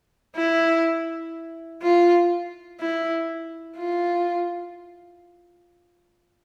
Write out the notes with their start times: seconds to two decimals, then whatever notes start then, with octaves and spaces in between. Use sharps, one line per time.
0.36 E4
1.83 F4
2.80 E4
3.78 F4